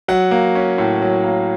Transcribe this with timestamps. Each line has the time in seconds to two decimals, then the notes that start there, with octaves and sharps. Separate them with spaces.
0.08 F#3 F#5
0.31 A#3
0.55 C#4
0.78 A2
1.02 F#3
1.24 A#3